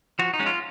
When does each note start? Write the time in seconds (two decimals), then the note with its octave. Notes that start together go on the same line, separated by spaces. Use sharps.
0.19 F3 F#4
0.34 D#4
0.39 G#3 C#4
0.46 F4